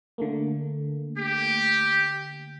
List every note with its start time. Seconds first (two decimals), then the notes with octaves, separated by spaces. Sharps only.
0.18 D3 A3 A#3
1.18 G4